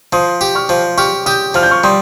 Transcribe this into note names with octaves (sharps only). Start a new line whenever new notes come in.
F3 C6 D#6
G4
C#6 F6
F3
G4 C#6 F6
G4 D#6 G6
F3 F6
G6
C#6 F6
G3 C6 D#6